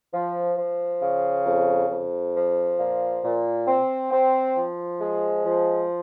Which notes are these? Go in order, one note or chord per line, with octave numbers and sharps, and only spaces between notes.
F3
F3
C#3
F2
F2
F3
A#2
A#2
C4
C4
F3
G#3
F3